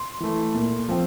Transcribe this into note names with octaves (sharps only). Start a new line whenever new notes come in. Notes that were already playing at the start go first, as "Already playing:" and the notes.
Already playing: C6
E3 A3
A#2
F3 C4